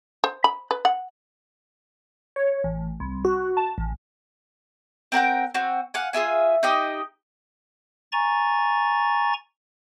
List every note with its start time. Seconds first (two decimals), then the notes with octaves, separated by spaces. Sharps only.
0.24 C5
0.44 B5
0.71 B4
0.85 F#5
2.36 C#5
2.64 A1
3.00 C2
3.25 F#4
3.57 A5
3.78 A1
5.12 C4 A#4 F#5 G5
5.54 C4 F#4
5.94 F5 F#5 G#5
6.13 F4 G#4 E5 G#5
6.63 D#4 G4 D#5
8.12 G#5 A#5 C#6 A6